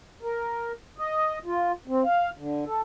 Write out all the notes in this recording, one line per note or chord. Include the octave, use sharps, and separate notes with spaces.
A#4
D#5
F4
C4
F5
D3
A4